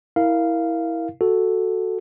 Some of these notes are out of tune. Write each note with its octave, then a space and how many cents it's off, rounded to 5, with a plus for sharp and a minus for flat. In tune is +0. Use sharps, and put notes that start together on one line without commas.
E4 -15 A#4 +0 F5 -10
F#4 +0 A4 +0